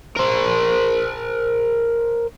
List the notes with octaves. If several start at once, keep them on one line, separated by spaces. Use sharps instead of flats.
A#4 C5